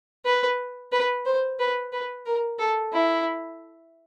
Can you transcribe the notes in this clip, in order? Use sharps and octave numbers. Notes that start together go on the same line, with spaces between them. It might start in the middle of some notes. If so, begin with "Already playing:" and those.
B4
B4
C5
B4
B4
A#4
A4
E4